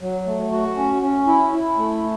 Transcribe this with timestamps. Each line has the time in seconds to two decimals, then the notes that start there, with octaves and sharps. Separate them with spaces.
0.02 F#3
0.27 A3
0.52 F#4
0.77 C#4
1.02 C#4
1.27 E4
1.53 E4
1.77 A3